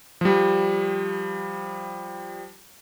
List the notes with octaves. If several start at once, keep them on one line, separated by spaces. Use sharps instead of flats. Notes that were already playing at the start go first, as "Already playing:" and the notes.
F3 G3